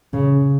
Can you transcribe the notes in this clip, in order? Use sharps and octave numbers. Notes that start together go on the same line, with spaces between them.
C#3